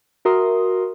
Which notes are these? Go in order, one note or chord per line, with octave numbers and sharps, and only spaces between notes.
F#4 A#4 E5 A#5 C6 D#6